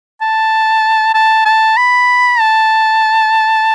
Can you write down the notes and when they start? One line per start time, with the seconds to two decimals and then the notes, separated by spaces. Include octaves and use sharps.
0.21 A5
1.14 A5
1.45 A5
1.77 B5
2.39 A5